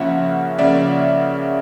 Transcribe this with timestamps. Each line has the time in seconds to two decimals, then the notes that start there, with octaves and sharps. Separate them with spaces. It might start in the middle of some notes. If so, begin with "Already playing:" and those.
Already playing: C#3 F3 A#3 C#4 E5 F#5
0.58 C#3 F3 A#3 C#4 D5 E5